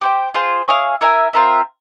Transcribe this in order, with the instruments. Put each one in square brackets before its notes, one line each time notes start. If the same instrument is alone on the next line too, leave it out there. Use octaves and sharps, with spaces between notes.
[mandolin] G4 C5 G5
F4 G#4 C5
E4 G#4 C#5 F5
E4 A#4 E5 G#5
C4 F4 A#4 E5